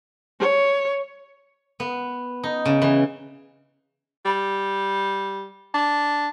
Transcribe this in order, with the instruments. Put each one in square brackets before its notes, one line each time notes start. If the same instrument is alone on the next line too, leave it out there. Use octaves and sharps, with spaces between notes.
[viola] C#5
[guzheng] B3
D#4
C#3
E3
[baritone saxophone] G3
D4